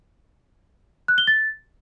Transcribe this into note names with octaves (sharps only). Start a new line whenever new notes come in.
F#6
G7
A6